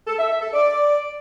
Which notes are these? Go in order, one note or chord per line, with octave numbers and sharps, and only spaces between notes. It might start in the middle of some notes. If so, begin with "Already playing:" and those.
A4
E5
E5
A4
D5